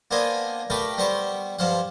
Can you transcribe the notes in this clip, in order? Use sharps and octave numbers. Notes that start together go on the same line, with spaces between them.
A#3 B3 D4 C5 D#5 G#5
A3 G4 A#4 B4 D5 G5
G3 B3 C5 C#6 D6
G2 F3 C5 F5 F#5